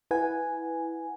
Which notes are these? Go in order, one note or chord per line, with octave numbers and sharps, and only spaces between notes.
E4 B4 F#5 G#5